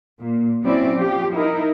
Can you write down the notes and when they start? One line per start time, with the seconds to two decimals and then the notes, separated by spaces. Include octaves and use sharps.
0.20 A#2
0.62 F#3 C4 C#4 E4 D5
0.97 F3 G4
1.35 D#4 E4 A#4